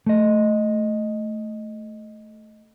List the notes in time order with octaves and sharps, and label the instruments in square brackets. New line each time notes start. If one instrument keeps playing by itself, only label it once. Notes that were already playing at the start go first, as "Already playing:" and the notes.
[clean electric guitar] A3 D#5